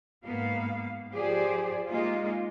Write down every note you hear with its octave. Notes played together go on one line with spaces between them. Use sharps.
G#2 A#3 B3 F5
F3 G4 G#4 C5 D5
G#3 A#3 D#4 F4